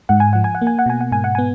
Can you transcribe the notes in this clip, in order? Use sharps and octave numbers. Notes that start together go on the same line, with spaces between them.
G#2 F#5
G#5
F3 F#5
G#5
F#5
A#3
G#5
F#5
B2 G#5
F#5
G#2 G#5
F#5
B3 G#5